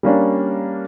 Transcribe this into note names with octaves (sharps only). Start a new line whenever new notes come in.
G3 A#3 C#4 D4